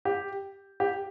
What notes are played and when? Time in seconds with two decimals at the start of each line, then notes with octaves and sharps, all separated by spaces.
0.05 G4
0.80 G4